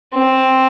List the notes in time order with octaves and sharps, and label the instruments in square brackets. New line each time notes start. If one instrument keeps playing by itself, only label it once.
[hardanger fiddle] C4